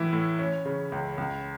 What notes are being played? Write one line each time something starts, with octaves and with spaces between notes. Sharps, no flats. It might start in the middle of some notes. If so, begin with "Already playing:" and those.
Already playing: A2 E3 E4
A2
C#4
C#3
C#2
C#2